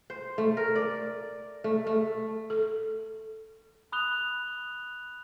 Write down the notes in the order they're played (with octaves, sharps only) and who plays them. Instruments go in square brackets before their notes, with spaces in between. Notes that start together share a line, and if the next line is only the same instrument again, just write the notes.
[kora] C5
A3
A#4
D5
A3
A3
[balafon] A4
[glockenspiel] B5 D#6 F#6 F7 G7